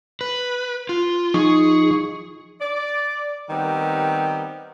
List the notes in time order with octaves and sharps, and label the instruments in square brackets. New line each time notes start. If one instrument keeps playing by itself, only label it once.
[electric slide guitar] B4
F4
[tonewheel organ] F3 D#4 C#6 [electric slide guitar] G#4
[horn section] D5
D#3 G3 B3 C4 G4 A#4